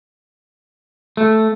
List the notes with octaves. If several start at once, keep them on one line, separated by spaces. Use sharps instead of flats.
A3